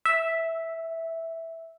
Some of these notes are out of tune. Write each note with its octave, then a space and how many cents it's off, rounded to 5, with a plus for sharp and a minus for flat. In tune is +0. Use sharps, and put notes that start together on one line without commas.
E5 -5